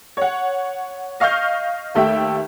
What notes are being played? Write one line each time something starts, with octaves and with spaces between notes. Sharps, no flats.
C#5 F#5
D#5 F5 C#6 F6 G6
D#2 A3 G4 E5 G5